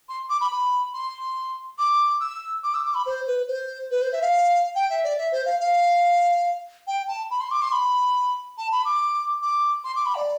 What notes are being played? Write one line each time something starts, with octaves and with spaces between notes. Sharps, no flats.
C6
D6
B5
B5
C6
D6
E6
D6
E6
D6
B5
C5
B4
C5
B4
C5
E5
F5
G5
E5
D5
E5
C5
F5
F5
G5
A5
B5
C6
D6
C6
B5
A5
B5
D6
D6
C6
D6
B5
D5